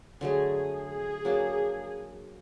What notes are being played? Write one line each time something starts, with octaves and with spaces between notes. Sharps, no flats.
D3 F#3 A3 G#4
G#4
F#3 A#3 D4